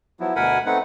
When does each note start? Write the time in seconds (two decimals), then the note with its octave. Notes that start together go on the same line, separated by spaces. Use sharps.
0.20 F3 F#3 B3 E4
0.36 D2 B2 A#4 F#5 G#5 B5
0.66 A3 C4 D#4 B4 F#5